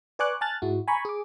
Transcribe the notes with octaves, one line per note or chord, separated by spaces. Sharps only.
B4 D5 G#5 C#6 D6 F#6
G#5 A5 F6 F#6 A6
G#2 G#3 E4 F#4
G#5 A#5 B5 C#6
G#4 D6